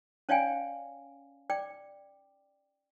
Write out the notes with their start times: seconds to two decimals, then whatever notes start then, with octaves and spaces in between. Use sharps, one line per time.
0.29 C#4 C#5 D5 F5 G5 G#5
1.50 D5 G5 D6